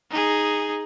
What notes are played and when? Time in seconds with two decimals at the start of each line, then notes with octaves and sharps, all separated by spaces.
0.11 D#4 G#4